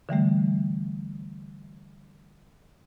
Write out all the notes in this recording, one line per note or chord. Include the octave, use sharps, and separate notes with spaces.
D3 E3 G3 A3